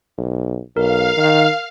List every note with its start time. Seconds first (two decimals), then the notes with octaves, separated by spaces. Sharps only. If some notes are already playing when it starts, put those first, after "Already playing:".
0.18 B1
0.77 B1 A#4 F5
1.17 D#3